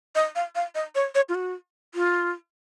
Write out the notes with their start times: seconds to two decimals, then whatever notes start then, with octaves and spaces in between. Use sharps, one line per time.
0.15 D#5
0.35 F5
0.55 F5
0.75 D#5
0.95 C#5
1.15 C#5
1.29 F4
1.35 F#4
1.94 F4